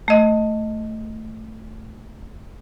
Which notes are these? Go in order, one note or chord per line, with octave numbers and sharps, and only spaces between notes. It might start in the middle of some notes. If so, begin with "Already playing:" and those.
A3 D#5